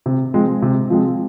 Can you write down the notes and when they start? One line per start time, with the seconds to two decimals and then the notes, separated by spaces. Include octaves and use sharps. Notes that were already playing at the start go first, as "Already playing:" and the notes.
0.06 C3
0.34 F3 G#3 C4
0.62 C3
0.90 F3 G#3 C4